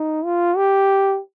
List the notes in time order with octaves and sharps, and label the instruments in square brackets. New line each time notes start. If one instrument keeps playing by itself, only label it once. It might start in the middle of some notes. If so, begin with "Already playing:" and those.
Already playing: [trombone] D#4
F4
G4